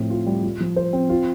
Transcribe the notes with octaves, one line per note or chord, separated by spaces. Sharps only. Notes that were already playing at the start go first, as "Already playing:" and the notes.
Already playing: A2 F3 C4
F4
G3
F4
F3
C5
C4
F4